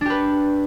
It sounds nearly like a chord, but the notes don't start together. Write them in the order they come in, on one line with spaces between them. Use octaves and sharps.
D4 G4 B4